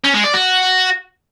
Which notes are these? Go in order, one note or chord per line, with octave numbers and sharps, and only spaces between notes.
C#4
G#3
D5
F#4